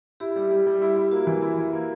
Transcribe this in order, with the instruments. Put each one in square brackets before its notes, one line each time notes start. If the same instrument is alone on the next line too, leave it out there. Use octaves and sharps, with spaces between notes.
[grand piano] E4 [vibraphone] G4
[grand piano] G3
G3
G3
E4
E4
[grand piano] A#3 [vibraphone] F#4
[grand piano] E3
E4
E4
A#3